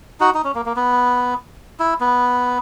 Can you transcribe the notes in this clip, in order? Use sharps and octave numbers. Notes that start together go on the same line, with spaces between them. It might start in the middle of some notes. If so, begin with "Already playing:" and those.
D#4 F#4
D#4
C#4
A#3
A#3
B3
E4
B3